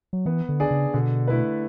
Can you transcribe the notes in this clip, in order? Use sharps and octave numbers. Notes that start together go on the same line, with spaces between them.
F#3
E3 B3
D3
D4 G#4 D5
C#3
B2 D3
A3 E4 B4